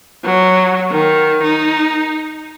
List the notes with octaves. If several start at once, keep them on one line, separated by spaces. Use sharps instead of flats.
F#3
D#3
D#4